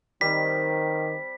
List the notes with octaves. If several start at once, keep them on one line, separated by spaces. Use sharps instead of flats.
D#3 G3 C4 B6